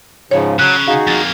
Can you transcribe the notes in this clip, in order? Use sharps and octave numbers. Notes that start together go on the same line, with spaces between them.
G#2 C#3 F3 C#5
C#3 F#3 F#6
D#4 F#4 G#4 F5
F2 A#3 A6